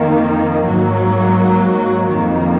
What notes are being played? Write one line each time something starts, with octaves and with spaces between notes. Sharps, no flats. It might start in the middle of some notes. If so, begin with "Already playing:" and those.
Already playing: F2 D#3 A#3
G#2 F#3 A#3
F2 D#3 A#3